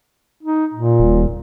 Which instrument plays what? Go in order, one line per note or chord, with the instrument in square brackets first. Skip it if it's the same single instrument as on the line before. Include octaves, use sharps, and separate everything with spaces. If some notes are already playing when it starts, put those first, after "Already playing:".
[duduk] D#4
A#2
[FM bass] D#1